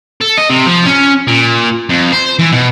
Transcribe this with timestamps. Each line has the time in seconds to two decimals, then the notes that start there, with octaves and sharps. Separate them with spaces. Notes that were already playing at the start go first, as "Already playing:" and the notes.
0.21 A4
0.38 D#5
0.50 C3
0.66 F3
0.86 C#4
1.28 A#2
1.89 F2
2.12 C5
2.39 E3
2.52 B2